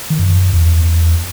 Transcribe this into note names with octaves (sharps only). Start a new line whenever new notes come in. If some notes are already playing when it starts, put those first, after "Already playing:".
D#3
F#2
E2